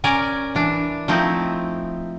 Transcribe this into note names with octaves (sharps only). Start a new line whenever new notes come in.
C#4 A#4 D5 G#5
E3 D4
F3 A3 C4 D#4 E4